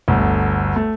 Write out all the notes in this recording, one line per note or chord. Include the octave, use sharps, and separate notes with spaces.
G1 D2
A3